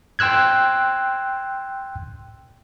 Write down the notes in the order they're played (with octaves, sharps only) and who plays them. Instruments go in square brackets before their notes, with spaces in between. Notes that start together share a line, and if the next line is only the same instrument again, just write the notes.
[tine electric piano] G5 C6 E6 F#6 G#6